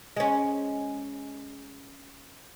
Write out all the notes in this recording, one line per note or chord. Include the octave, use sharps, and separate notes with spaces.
G#3 C#4